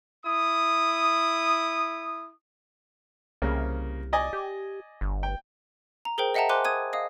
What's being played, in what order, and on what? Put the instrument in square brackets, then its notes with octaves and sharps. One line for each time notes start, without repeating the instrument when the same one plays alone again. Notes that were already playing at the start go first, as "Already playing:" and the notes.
[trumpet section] E4 D#6
[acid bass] C2 [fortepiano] C#3 A#3
[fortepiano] D5 D#5 G#5
[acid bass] G4
G1
[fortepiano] G5
[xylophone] A#5
G#4 A#4 C5 G5
D#5 E5 F#5 G5 A5 A#5
C5 G#5 C6 D6 F#6
D#6 G#6 D#7
D#5 F5 D#6